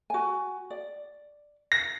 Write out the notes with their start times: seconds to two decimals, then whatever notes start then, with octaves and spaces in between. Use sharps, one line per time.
0.10 F#4 G#5
0.70 D5
1.72 A#6